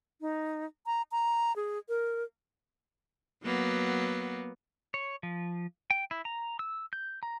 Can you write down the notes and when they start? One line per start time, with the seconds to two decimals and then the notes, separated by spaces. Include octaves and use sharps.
0.21 D#4
0.86 A#5
1.12 A#5
1.56 G#4
1.89 A#4
3.44 F#3 A#3 B3
4.94 C#5
5.23 F3
5.90 G5
6.11 E4
6.25 A#5
6.59 E6
6.93 G6
7.23 A#5